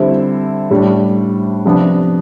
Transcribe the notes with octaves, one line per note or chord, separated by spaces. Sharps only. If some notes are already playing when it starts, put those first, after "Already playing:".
Already playing: D3 G3 C4 E4
A2 G3 D4
C3 F3 B3 D4